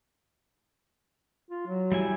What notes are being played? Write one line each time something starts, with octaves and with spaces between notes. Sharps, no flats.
F4
F#3
G3 E4 G#5